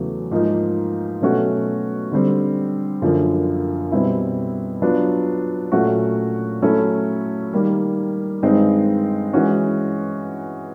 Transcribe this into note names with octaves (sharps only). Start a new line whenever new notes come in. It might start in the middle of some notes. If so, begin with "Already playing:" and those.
Already playing: E2 C#3 F#3 A3
G#2 F3 A#3 D#4
B2 F#3 A3 C#4 F#4
D3 G3 C4
F#2 D3 F3 A#3
B2 G3 C4 E4
F#3 B3 D4 F4
A#2 F#3 A3 C#4 F#4
F#3 A3 C#4 E4 A4
D#3 G3 A#3
G2 D#3 G#3 C4 D#4
E3 G#3 C#4 F#4